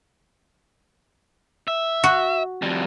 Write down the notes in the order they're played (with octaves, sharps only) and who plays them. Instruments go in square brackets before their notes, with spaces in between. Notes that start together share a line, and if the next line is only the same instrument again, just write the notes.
[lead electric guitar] E5
[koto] F#4
[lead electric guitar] F2 G3